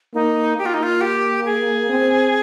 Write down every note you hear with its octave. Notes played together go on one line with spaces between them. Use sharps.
A#3 D#4
A#3 G4
F4
D#4
F4
G4
G#4
C4